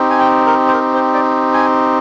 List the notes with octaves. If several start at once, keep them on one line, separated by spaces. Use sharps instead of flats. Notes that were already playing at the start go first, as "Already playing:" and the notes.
Already playing: C4 D#4 G4
G#5
G5
A#4
C5
A#4
C5
D5
G#5